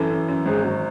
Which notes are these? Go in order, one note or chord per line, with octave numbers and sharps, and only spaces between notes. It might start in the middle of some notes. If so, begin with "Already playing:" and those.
Already playing: F#2 E3 A4
F#2
F#2
G#1 G#4
G#1 F#4